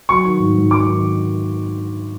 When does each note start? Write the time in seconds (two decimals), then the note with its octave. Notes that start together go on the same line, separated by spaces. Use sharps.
0.09 F#3 C#6
0.24 D#3
0.40 G#2
0.56 G#2
0.71 F#3 D6
0.87 D#3